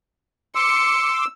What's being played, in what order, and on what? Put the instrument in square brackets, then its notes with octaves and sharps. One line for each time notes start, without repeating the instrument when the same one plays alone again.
[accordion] C6 D6 [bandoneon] E6 [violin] C#7